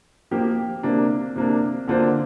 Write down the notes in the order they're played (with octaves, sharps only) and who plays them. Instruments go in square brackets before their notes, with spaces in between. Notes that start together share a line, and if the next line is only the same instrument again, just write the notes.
[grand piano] F3 A#3 G4 A#4
C3 A#3 D4
C3 A#3 D4
D3 A#3 D4 F4 C5